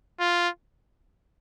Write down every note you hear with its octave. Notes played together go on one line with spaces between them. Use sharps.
F4